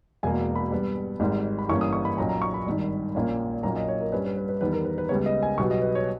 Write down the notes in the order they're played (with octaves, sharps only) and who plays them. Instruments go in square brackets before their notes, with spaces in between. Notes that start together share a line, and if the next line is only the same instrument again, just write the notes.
[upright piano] E1 E2 B2 A#3 G#5
B5
G2 G3 B3
G#1 G#2 G3
B5
G1 G2 E3 A#3 C#4 C#6
D#6
C#6
B5
B1 A#2 A#3 C#4 A#5
A#5
C#6
B5
G#1 G2 D#3
A#1 A#2 A#3 C#4
B1 A#2 A#3 C#4 A#5
D#5
C#5
A#4
G2 G3 C#4 B4
B4
B4
B4
E2 D#3 G3 B3 B4
A#4
B4
B4
C#2 C#3 G3 B3 C#5
D#5
G#5
B1 B2 G3 B3 C#6
D#5
B4
C#5